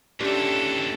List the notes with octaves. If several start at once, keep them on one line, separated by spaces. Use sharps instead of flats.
D#2 E3 C#4 D4 F4 G4 A4